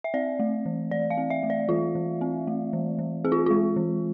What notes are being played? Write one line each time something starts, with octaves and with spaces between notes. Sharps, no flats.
E5
C4 D5
A3
E3
E3 D5
F5
C4
E5
A3
D5
E3 F4
E3
C4
A3
E3
E3
C4 G#4
F4
G#3 F4
E3